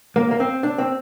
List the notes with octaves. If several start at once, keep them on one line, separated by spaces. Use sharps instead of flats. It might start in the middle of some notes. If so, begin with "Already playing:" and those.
A#3
A#3
C4
D4
C4